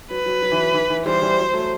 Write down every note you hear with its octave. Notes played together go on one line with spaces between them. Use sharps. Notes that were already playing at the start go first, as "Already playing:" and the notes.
F#3 B4
F#3
F#3
E3
F#3
E3
E3
E3 G3 C5
E3 G3
F#3
F#3 A3